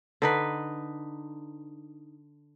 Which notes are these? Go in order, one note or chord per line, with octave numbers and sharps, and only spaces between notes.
D3 D#4 B4